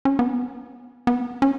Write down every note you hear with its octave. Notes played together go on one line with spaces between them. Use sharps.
C#4
B3
B3
C#4